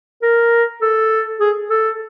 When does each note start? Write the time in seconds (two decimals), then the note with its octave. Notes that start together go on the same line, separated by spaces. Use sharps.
0.22 A#4
0.82 A4
1.40 G#4
1.70 A4